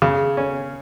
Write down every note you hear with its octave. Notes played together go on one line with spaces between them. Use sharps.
C#3
C#4